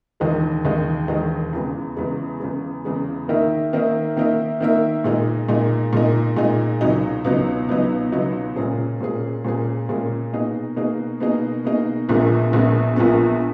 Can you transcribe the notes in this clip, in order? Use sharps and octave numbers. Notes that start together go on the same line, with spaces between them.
E1 D#2 D#3 G#3 D#4
E1 D#2 D#3 G#3 D#4
E1 D#2 D#3 G#3 D#4
E2 C#3 G#3
E2 C#3 G#3
E2 C#3 G#3
E2 C#3 G#3
D#3 A#3 D#4 A#4 E5
D#3 A#3 D#4 A#4 E5
D#3 A#3 D#4 A#4 E5
D#3 A#3 D#4 A#4 E5
A#2 G#3 D#4
A#2 G#3 D#4
A#2 G#3 D#4
A#2 G#3 D#4
C#2 B2 F#3 B3 D#4
C#2 B2 F#3 B3 D#4
C#2 B2 F#3 B3 D#4
C#2 B2 F#3 B3 D#4
A#2 G#3 C#4 G#4
A#2 G#3 C#4 G#4
A#2 G#3 C#4 G#4
A#2 G#3 C#4 G#4
B2 A#3 D#4 G#4
B2 A#3 D#4 G#4
B2 A#3 D#4 G#4
B2 A#3 D#4 G#4
A#1 A#2 G#3 B3
A#1 A#2 G#3 B3
A#1 A#2 G#3 B3